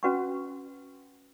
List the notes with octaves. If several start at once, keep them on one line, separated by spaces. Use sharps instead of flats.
C#4 F#4 B4 F#5 C#6